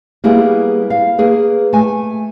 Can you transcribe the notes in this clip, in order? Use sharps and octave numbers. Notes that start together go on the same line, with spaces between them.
G3 A#3 B3 E4 G#4
F5
A#3 G#4 B4
A3 G#5